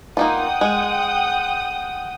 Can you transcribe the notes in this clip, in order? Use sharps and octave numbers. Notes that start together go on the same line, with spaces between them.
A#3 D#4 F4 F#5 G5 D#6
G#3